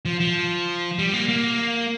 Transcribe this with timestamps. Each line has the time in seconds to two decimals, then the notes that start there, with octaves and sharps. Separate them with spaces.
0.05 F3
0.20 F3
0.99 G3
1.14 A#3
1.29 A#3